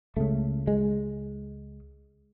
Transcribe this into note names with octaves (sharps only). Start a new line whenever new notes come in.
C#2 C#3 A3
G#3